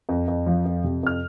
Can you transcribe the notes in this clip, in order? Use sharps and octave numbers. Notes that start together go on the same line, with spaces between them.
F2
F2
F3
F2
C3
F2 F6